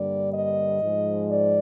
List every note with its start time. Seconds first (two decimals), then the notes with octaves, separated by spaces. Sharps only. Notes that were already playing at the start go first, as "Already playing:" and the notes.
Already playing: G2 D3 G3 A#3 D5
0.33 D#5
0.82 G#2 F3 G#3
1.30 D5